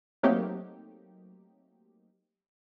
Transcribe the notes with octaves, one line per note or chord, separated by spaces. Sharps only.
F#3 A3 A#3 C4 D#4 G4